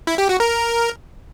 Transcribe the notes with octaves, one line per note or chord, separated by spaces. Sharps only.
E4
G4
F#4
A#4